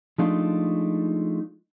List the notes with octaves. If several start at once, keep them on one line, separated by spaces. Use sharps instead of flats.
F3 G#3 A3 D4 D#4 F4